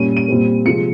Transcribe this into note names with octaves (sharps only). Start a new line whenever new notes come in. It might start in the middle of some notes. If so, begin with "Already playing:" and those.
Already playing: A#2 G3 C#4 D#7
D#7
A#2 G3 C4
C3 F3 G#3 C#7